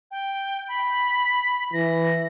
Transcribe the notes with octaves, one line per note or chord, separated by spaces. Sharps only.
G5
B5
E3 A#6